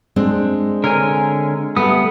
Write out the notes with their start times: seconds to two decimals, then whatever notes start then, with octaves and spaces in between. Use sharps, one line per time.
0.16 G#3 C4 D4
0.84 D3 A#4 C#5 G#5
1.77 G3 A3 B3 D#6